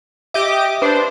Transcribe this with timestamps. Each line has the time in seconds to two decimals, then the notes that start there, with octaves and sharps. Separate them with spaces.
0.34 G4 D#5 E5 D6
0.82 D4 B4 C5